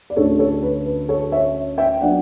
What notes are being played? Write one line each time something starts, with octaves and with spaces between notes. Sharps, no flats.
D5
D2 D3 A3 C#4 A4 C#5
A4 C#5
B4
B4
A4 C#5
C#5 E5
E5 G5
F#3 B3 D4 D5 F#5